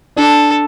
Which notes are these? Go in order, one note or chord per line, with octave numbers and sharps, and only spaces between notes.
D4 A4